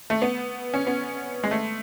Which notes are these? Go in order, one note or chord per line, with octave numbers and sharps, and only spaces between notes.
A3
B3
C#4
B3
G#3
A3